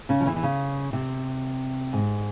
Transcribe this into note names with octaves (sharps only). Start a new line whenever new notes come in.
C#3 C#4
F3
E2 E3
E3
C#3
C3
G#2